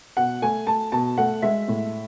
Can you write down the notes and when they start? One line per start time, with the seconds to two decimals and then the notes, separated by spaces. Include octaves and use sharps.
0.17 B2 F#5
0.42 A3 G#5
0.67 A3 A5
0.92 B2 A5
1.18 A3 F#5
1.42 G#3 E5
1.68 A2